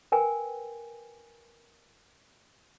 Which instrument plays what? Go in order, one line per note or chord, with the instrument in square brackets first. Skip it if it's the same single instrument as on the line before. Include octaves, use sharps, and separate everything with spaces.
[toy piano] A#4 B4 G5 G#5